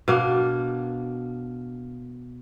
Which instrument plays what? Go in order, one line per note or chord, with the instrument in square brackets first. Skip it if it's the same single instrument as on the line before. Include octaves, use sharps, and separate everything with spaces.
[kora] B2 A#3 D4